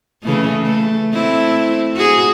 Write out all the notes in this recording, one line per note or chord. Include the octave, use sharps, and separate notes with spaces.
C#3 E3 A3
A3
A3 C4 E4
F#4 G#4